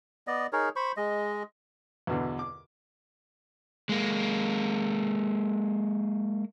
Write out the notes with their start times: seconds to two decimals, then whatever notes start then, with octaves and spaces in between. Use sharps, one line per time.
0.27 B3 D5 D#5
0.53 D#4 G#4 A#4 C#5
0.76 C5 B5 C#6
0.97 G#3 D#5
2.07 E2 B2 D3
2.39 D6
3.89 G#3 A#3